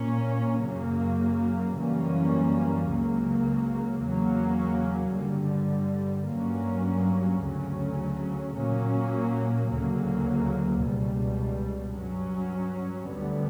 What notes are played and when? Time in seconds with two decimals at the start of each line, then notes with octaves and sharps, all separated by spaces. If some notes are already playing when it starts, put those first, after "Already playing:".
Already playing: A#2 A#3 C#4
0.63 F#2 C#3 F#3 A#3
1.75 F#2 E3 G3 A#3 C#4
2.89 C#2 C#3 F#3 A#3
4.02 E2 C#3 F#3 A#3 C#4
5.15 G2 D3 G3
6.29 G2 F#3 A#3 C#4
7.42 D2 C#3 F#3 C#4
8.56 A#2 F#3 A#3 C#4
9.69 D2 C#3 F#3 A#3
10.82 C#2 B2 G3
11.95 G2 F#3 C#4
13.09 D2 D3 G3 B3